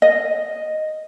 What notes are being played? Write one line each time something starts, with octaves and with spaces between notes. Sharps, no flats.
D#5